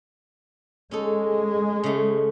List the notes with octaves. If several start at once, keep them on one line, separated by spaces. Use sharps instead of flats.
G#3 C#4 D#4 A4
C#3 A3